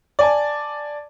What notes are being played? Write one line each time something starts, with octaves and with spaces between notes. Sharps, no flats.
D5 G#5 A5